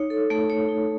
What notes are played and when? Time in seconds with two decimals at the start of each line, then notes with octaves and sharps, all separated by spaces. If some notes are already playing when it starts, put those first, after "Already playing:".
Already playing: D#4 C#5
0.10 A4
0.30 A3
0.50 C#5
0.69 D#4